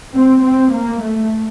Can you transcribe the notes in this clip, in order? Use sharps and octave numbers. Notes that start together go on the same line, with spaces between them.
C4
C4
A#3
A3